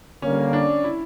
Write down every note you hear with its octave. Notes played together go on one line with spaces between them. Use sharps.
D3 G3 A#3 C#4
D4
E4